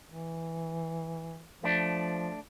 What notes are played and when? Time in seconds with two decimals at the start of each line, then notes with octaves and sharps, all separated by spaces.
0.11 E3
1.63 F3 A3 D4